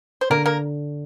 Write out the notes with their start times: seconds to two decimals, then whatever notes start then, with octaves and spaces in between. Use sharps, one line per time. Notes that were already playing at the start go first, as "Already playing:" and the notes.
0.21 C5
0.30 D3 A#3 A#4
0.46 A#3 A#4